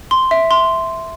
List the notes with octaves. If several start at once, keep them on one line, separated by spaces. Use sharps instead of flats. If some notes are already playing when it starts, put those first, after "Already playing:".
C6
E5
C6